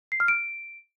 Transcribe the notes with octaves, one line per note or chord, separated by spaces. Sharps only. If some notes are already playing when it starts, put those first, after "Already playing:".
C7
F6
D7